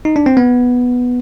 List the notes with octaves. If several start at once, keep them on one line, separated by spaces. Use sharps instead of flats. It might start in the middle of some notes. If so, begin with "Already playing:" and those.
D#4
D4
C4
B3